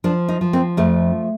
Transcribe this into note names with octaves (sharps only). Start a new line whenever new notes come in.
F3 D4
D#4
F3
C4
F2 A3